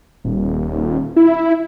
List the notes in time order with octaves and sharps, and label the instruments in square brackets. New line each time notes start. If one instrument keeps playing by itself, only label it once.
[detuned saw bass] D#1
E4